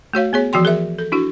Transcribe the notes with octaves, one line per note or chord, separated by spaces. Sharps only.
A3 F#4 C#5 F5
B3 G#4 C#5
E3 F3 F#4 G5 C6
G#4 A#4 E5
A4
D4 E4 F#4